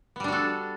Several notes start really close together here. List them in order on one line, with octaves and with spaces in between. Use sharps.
B3 G3 D4 F#4 A4